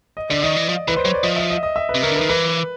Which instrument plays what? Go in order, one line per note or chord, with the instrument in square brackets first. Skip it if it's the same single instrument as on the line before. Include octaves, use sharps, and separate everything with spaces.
[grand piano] D#5
[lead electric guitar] D3 [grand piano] D5
[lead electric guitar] D#3 [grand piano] D#5
[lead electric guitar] E3
F3
[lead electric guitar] E3 [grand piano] B4
[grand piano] C5
[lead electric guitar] F#3 [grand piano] C#5
[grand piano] D5
[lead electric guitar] F3 [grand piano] D#5
[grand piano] E5
D#5
D#5
E5
B4
[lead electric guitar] C3
[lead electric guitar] C#3 [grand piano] A#4
[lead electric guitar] D3
[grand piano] B4
[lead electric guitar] D#3
[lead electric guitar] E3 [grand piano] B4